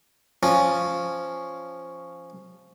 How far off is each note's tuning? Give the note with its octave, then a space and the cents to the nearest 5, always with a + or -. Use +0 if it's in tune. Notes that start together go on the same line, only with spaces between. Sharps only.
F3 +0 C#4 +0